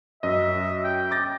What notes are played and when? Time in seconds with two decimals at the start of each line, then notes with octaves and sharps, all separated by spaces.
0.23 F#2 D#5 E5
0.84 G5
1.11 D6 A6 A#6